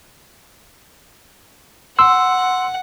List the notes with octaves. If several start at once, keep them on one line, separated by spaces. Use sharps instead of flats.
F#5 C6 E6